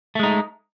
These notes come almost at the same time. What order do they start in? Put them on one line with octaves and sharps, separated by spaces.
A3 G#3 D#4